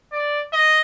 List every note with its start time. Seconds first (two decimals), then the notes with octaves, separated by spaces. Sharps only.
0.12 D5
0.53 D#5